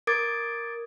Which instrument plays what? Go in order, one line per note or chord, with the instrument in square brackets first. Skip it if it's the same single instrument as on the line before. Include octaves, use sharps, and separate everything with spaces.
[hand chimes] A#4 D6 D#6 G#6 A6 D7